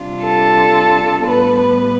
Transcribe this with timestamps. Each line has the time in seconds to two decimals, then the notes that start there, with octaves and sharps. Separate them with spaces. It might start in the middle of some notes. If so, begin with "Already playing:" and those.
Already playing: C3 G3 D4 F4
0.24 A4
1.25 A2 G3 B3 B4
1.59 B4